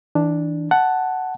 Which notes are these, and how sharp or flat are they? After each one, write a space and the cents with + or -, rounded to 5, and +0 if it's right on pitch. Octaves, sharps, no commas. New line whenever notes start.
E3 -25 D4 +0
F#5 +5 A5 +0